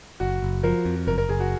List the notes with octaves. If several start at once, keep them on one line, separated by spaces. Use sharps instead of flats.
F#1 F#4
F#1
F3 A#4
F2
F#1 A#4
A#4
F#1 G#4
F#4